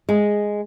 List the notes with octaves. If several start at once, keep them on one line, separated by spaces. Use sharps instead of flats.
G#3